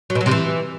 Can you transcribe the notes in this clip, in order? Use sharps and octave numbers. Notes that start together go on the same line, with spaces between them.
F#3
B2
F#3
C3
E3